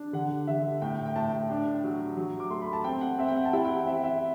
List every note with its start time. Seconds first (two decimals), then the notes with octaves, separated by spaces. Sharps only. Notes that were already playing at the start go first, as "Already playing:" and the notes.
Already playing: D4
0.13 D3 F#5
0.47 D3 E5
0.81 A2 G5
1.06 G5
1.16 A2 A5
1.50 D4
1.84 F#3
2.17 F#3
2.40 D6
2.50 A3 C6
2.62 B5
2.73 A5
2.84 C4 G5
3.01 F#5
3.18 C4 E5
3.28 G5
3.36 F#5
3.45 A5
3.53 E4 G5
3.65 G5
3.69 F#5
3.86 C4 E5
4.04 E5